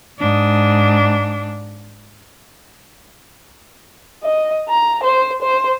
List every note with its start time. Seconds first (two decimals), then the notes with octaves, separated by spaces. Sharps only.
0.19 G#2 D4
4.23 D#5
4.69 A#5
5.04 C5
5.42 C5